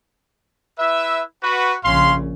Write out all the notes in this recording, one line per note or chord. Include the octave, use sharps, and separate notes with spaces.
E4 B4 E5
F#4 B4
A#1 C#3 C#4 F5 C6